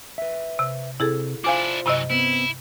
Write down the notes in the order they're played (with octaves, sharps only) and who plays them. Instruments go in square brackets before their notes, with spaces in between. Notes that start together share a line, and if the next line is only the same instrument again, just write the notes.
[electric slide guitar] B4 E5
[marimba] C3
[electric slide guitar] C3 [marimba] E4 G#4 A4
[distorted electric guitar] D4 E4 [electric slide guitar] F4 C5 [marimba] F5 G#5 D6
[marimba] G2 C3 D#5 [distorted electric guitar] E3 F#3
[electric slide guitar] B3 C4 [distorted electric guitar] E4